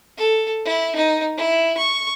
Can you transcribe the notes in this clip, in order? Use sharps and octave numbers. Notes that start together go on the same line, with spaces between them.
A4
E4
D#4
E4
C#6